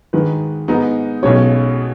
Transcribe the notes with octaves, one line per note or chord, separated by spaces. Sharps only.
G#2 D#3 G#3 B4
G#2 G#3 B3 D#4
B1 B2 G#3 C#4 C#5